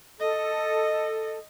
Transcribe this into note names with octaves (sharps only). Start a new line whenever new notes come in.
A4 D#5